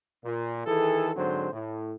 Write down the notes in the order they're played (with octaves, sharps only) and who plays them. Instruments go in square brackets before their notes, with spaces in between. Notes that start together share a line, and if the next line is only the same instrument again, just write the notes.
[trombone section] A#2
D#3 E3 G#4 A4
G#2 D3 F#3 C4 C5
A2